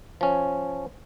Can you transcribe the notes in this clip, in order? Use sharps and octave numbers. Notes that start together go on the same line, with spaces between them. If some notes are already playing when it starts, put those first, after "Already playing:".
F3 C#4